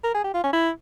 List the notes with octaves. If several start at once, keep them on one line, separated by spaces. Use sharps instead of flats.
A#4
G#4
G4
F4
C#4
E4